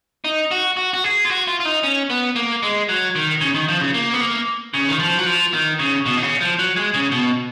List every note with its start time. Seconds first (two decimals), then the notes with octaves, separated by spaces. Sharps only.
0.24 D#4
0.51 F#4
0.77 F#4
0.93 F#4
1.04 G#4
1.25 F4
1.30 F#4
1.48 F4
1.60 F4
1.65 D#4
1.83 C#4
2.10 B3
2.36 A#3
2.63 G#3
2.89 F#3
3.16 D#3
3.41 C#3
3.54 D#3
3.68 F3
3.81 C#3
3.94 A#3
4.14 B3
4.21 A#3
4.74 C#3
4.89 D#3
5.00 F3
5.18 F#3
5.26 F3
5.53 D#3
5.79 C#3
6.06 B2
6.17 D#3
6.23 C#3
6.41 F3
6.59 F#3
6.76 G#3
6.94 C#3
7.11 B2